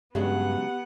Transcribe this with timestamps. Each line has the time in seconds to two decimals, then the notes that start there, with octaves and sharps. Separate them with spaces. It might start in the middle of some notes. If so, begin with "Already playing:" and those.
0.15 G2 C#3 F#3 G#3 B3 G4 F#5